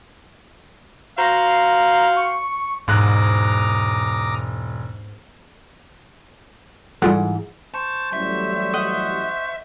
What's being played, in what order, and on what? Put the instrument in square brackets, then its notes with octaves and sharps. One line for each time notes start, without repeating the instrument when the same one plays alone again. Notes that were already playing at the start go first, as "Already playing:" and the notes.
[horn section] F#4 C5 F5 [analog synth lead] A#5
[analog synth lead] C#6
[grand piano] E1 F#6 [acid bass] G#2 [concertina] A#5 D6 D#6
[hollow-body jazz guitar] G#2 E3 F#5 [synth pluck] G3 F4 A4
[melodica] C5 C#6 [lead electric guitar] A5
[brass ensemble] A1 F#3 G3 [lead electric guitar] E5
[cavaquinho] D#5 F#5